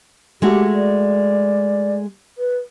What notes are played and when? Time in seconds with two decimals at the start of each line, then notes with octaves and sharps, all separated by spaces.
0.42 G#3 A3 F#4 G4
0.74 D5
2.38 B4